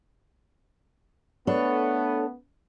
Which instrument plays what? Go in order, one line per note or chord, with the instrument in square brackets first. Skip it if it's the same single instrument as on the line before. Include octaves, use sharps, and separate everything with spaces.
[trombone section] A3 B3 [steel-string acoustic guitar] D4 A4 C#5